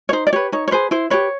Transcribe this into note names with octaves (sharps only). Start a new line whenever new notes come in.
C#5
D#4 C5
D5
G4 B4 C#5
D#4 C#5
C#5
G#4 B4 C5
E4 C5
G4 B4 C#5